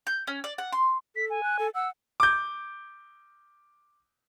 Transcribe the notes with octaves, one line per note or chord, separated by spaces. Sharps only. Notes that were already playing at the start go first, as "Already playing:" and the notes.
G6
C#4
D5
F#5
C6
A4 B6
G#5
F#6
A4
F#5 E6
D6 G6